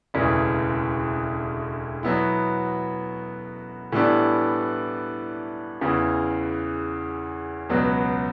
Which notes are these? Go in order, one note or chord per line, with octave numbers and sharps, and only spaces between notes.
E1 D2 C#3 E3
B2 F#3 B3 E4
A2 E3 G3 B3 D4
E2 C#3 E3
C#2 B2 F#3 B3